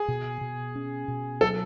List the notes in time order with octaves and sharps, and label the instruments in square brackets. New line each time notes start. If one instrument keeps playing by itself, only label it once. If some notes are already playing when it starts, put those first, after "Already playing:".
Already playing: [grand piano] G#4
[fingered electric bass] B2
B2
C#4
B2
[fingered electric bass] F#3 [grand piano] A4